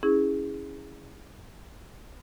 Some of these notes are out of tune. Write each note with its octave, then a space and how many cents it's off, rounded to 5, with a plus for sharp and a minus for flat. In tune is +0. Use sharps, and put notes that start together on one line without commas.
C#4 +0 E4 -20 G#4 -10